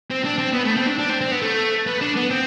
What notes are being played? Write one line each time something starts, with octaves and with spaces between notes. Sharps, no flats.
C4
D4
C4
B3
A3
C4
D4
D4
C4
C4
B3
A3
B3
D4
B3
C4